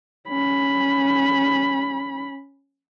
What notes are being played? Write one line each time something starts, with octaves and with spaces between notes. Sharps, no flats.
C#4 B5